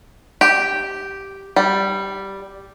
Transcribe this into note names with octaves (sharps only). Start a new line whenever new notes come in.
G4
G3